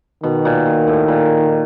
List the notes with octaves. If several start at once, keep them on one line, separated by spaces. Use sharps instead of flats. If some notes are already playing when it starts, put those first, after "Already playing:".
B2 D#3
A#2
A#2
A2
A#2